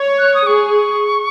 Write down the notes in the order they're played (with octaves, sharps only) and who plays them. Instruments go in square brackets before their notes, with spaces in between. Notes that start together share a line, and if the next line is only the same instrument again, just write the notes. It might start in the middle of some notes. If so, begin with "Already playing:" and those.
Already playing: [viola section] C#5
[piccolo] F#6
D#6
[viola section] G#4 [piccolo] C#6